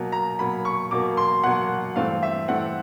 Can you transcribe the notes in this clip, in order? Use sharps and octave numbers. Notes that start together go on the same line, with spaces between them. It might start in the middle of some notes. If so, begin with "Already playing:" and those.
Already playing: B2 F#3 A#3
A#5
B2 F#3 A#3 B5
C#6
B2 F#3 A#3 D6
C6
B2 F#3 A#3 F#5
G2 E3 A3 C4 F5
E5
G2 E3 A3 C4 F#5